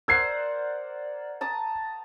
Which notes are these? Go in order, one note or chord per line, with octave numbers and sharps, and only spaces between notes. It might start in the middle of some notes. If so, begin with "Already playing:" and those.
A#4 C5 D5 F#5 E6 G#6 C7
A5 A#5 D#6